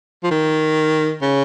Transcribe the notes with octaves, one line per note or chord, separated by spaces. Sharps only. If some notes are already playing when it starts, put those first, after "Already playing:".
F3
D#3
C#3